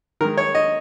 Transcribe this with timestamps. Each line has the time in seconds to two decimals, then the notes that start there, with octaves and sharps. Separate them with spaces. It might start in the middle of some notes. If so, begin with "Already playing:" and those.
0.21 D#3 A#4
0.24 G#3
0.37 C#5
0.55 D#5